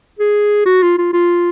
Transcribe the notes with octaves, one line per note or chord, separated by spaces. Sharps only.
G#4
F#4
F4
F4
F4